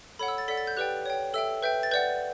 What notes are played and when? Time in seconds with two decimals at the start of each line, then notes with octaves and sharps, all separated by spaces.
0.19 A4 C#5 F#5 B5
0.28 E6
0.38 A6
0.48 A4 D5 F#5 B6
0.57 A6
0.67 G6
0.76 G4 B4 D5 G5 F#6
1.06 C#5 G5
1.34 A4 E5 G5 E6
1.62 B4 E5 G5 G6
1.83 A6
1.92 B4 D5 F#5 G6